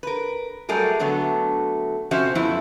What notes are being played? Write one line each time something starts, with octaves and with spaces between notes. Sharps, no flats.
A#4 B4
F#3 G3 A3 G#4 A#4
D3 F#3 A3 B3
C3 F3 C#4 F#4 C5 E5
F#2 F3 A3 B3 E4